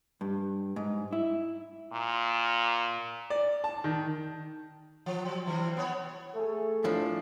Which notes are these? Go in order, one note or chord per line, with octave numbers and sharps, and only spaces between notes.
G2
G#2
E4
A#2
D5
A5
D#3
F3
F#3
C3 E3 G3
B3 C#5
A3 G#4 A4
A2 F3 D4